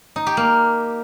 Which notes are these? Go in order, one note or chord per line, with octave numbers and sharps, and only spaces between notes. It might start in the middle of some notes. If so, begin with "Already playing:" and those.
D#4
G4
A#3